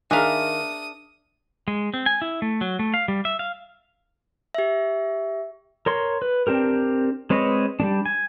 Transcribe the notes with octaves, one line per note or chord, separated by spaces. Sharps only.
D#3 D4 G#4 A#4 E5 F5 G#5 D#6
G#3
C4
G#5
E4
A3
F#3
A3
F5
G3
E5
F5
G4 E5
A#4 C#5 C6
B4
C4 D4 G4 A#4
G#3 C4 B4 C#5 D#5
G3 A3 D4
G#5